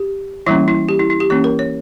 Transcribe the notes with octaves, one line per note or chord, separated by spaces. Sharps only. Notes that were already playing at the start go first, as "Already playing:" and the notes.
Already playing: G4
E3 G3 A#3 C#4 E4
E4
G4
E4
E4
G4
E3 A#3 C#4 C#5
A#4
C#5